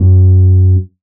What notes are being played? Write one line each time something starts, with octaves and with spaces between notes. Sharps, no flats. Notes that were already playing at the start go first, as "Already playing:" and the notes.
Already playing: F#2